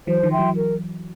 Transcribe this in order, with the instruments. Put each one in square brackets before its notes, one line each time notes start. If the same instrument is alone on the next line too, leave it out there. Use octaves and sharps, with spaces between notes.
[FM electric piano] E3 F#3 [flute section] C5
[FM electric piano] D#3 F3
[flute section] E5 G5 C6
[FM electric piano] E3 F#3
[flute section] A#4